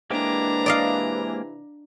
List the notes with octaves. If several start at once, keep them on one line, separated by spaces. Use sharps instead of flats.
C3 E3 G#3 A#3 D4 G4 A#5
D5 D#5 F5